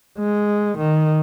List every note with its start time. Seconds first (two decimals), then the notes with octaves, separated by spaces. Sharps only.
0.18 G#3
0.78 D#3